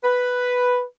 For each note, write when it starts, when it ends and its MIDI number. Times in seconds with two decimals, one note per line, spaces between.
0.03 0.81 71